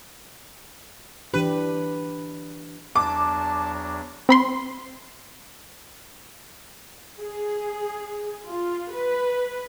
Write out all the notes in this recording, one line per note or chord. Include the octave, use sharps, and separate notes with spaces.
E3 D4 G4 B4
E2 F#3 D4 A5 D6
C4 B5 C6
G#4
F4
B4